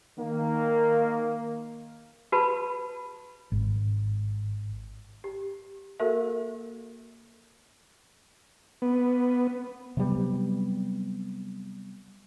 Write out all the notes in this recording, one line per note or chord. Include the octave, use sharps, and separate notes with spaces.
D#3 A#3
F#4 B4 A5 B5
G#1
G4
A#3 F#4 A4 A#4 E5
B3
C3 F#3 G3 B3